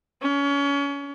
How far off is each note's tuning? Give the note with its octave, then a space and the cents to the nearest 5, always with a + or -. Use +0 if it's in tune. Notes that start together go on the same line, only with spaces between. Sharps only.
C#4 +30